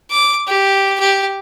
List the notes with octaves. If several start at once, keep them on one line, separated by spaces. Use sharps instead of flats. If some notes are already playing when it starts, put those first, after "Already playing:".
D6
G4
G4